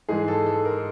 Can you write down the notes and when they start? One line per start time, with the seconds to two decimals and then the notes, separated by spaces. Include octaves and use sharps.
0.09 G#2 E3 G#3 G#4
0.28 A4
0.46 A4
0.65 A#4